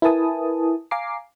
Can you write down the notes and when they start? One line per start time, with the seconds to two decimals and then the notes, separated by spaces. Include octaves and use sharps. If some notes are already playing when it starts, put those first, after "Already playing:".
0.02 E4 A#4 B4 G#5 A5 D#6
0.91 F5 G#5 A#5 D6 C7